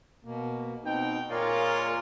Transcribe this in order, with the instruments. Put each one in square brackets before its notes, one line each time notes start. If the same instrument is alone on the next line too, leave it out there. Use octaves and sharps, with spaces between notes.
[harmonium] B2 A#3
[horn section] B2 G5 [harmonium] C4 D#4
[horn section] A#2 G#3 F4 [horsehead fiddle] A#4 [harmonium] C#5 D5 F5